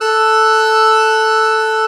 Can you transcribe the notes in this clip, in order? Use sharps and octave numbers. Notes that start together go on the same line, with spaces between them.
A4 E6 F#6